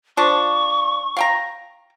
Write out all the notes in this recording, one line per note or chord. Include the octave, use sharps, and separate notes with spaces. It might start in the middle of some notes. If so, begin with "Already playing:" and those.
F3 D4 C#6
F5 G5 A#5